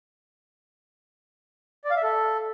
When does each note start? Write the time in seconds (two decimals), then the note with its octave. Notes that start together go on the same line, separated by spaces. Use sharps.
1.84 D5
1.91 F5
1.97 E5
2.03 A4